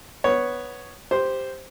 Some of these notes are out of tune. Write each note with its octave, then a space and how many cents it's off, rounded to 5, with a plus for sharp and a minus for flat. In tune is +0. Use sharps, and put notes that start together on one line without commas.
B3 +0 C#5 +0
G4 +0 C5 +0